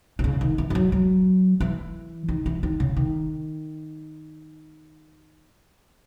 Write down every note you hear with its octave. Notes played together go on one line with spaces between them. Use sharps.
D#3
C#3
D#3
E3
E3
F#3
F#3
E3
D#3
E3
D#3
C#3
D#3